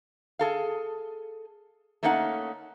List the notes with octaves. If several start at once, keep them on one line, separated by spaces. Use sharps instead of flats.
G#4 A4 F5
A3 A#3 C#4 D#4 E5 F#5